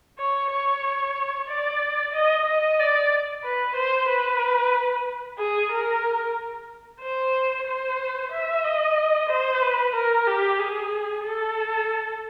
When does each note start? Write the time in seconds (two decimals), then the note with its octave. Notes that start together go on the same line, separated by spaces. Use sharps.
0.18 C#5
0.51 C#5
1.48 D5
2.14 D#5
2.47 D#5
2.79 D5
3.44 B4
3.76 C5
4.09 B4
5.39 G#4
5.72 A#4
7.02 C5
7.66 C5
8.32 E5
8.64 D#5
9.30 C5
9.62 B4
9.95 A#4
10.27 G4
10.59 G#4
11.25 A4